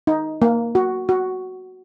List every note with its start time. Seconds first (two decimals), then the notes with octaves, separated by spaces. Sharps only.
0.07 D#4
0.42 A#3
0.75 F#4
1.09 F#4